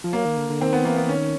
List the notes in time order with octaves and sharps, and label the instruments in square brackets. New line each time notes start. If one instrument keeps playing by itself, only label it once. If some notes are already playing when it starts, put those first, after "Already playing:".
[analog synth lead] F3
[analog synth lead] F#3 [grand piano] A#3
[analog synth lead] D#3
D3
D3
[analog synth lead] D#3 [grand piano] C4
[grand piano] B3
[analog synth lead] E3 [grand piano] A#3
[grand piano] B3
[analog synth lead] D#3 [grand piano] C#4